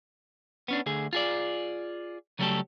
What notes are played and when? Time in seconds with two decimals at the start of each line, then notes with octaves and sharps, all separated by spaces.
0.68 B3 C#4 D4
0.86 D2 D3 G#4
1.13 F4 G#4 D5
2.39 C#3 F#3 G3 A3 G4 A4